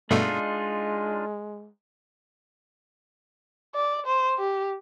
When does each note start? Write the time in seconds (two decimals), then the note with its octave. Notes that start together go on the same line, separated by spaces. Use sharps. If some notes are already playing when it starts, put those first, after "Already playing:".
0.11 G2 B2 G#3 A3 D4 D#4 F4
3.75 D5
4.07 C5
4.39 G4